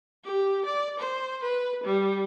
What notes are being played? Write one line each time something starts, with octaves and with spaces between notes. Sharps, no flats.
G4
D5
C5
B4
G3